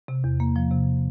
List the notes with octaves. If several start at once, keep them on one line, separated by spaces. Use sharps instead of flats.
C3
E2
A#3
F3
C3